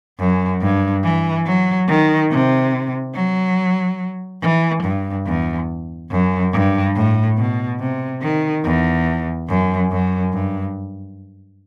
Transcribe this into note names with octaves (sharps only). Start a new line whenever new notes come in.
F#2
G2
E3
F#3
D#3
C3
F#3
E3
G2
E2
F#2
G2
A2
B2
C3
D#3
E2
F#2
F#2
G2